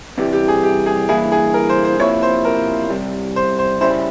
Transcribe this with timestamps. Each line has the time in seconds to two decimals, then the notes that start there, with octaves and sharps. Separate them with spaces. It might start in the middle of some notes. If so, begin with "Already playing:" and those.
0.18 C2 C3 E3 G3 G4
0.33 G4
0.48 G#4
0.63 G4
0.86 G#4
1.09 G2 E3 A#3 E4 G#4
1.32 G#4
1.54 A#4
1.69 C5
1.84 C5
1.99 C3 F3 A#3 E4 C#5
2.23 C5
2.45 A#4
2.90 C2 C3 G3
3.36 C5
3.59 C5
3.81 C#3 G3 C#4 E4 C5